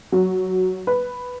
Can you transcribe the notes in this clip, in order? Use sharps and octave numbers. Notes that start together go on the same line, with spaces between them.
F#3
B4